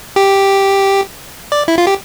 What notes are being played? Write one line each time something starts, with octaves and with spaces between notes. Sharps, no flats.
G4
D5
E4
F4
G4